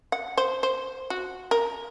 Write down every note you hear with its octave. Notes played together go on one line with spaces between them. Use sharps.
F#5
C5
C5
F#4
A#4